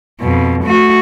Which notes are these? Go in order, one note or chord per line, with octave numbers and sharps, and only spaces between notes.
F2 B2
A3 F#4